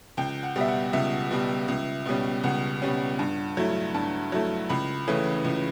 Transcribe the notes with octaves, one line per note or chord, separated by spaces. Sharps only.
C#2 G5
F#5
B2 G3
E5
F#5
C#2 E5
B2 G3
C#2
B2 G3 C#4
C#2 F#5
B2 G3 C#4
G2
F#3 A3 E4
G2 A5
F#3 A3 E4
C#2 B5
C#3 E3 A3 C#4
C#2